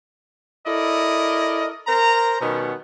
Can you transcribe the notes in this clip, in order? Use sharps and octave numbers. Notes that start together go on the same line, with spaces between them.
E4 A4 A#4 D5 D#5
A#4 C5 A#5
B2 D#3 G3 B3 C#4